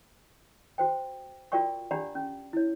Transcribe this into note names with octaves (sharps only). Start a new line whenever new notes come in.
F#4 C5 G5
F4 F#4 A#4 D5 G5 C#6
D4 G4 D5 F#5 A#5 B5
C#4
E4 C#5